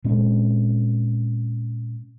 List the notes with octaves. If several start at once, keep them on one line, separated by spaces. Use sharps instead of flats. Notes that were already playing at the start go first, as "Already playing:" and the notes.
A#2 G#3 C4 C#4